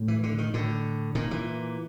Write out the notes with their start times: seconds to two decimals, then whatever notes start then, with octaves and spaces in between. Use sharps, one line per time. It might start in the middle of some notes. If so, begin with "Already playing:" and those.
Already playing: A2
0.08 E3
0.23 D3
0.38 D#3
0.54 A2 D3
1.15 A#2 D#3
1.31 E3